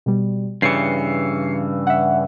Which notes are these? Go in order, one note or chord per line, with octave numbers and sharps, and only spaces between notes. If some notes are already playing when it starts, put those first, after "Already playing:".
B2 G3
G2 C#3 E3 C7 C#7
E5 F#5